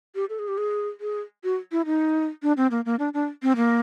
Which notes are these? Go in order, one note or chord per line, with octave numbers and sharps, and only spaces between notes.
G4
A4
G#4
G4
G#4
G#4
F#4
E4
D#4
D4
C4
A#3
A#3
D4
D4
C4
A#3